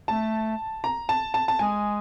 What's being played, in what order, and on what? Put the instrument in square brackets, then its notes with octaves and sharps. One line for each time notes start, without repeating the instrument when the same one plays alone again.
[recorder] A3 [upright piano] A5
[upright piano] A#5
A5
A5
A5
[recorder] G#3 [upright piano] G#5